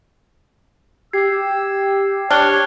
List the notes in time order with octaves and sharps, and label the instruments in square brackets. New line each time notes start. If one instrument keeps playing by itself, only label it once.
[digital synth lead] G4 [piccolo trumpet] E6 [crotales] G#6 C7
[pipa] D4 [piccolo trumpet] C#5 [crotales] F6 F#6 G7